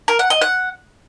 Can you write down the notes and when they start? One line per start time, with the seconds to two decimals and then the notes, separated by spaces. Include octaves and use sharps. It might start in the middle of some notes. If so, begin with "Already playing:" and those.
0.08 A#4
0.19 F#5
0.30 D#5
0.42 F#5